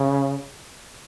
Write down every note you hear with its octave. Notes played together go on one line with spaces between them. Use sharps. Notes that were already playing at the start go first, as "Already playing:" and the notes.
Already playing: C#3